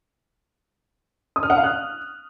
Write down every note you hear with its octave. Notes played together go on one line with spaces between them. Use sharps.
D#6
F6
F#5
F5
F#6